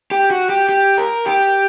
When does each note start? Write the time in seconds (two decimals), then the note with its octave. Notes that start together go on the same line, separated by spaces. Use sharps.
0.11 G4
0.31 F#4
0.49 G4
0.69 G4
0.98 A#4
1.26 G4